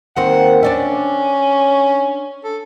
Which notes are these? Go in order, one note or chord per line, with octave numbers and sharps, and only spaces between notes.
D#2 A#3 C4 F#5
C#4 D4 D5 E5
A4